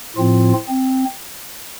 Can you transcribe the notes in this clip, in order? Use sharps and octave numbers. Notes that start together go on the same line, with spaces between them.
A2 F3 C4 F4
C4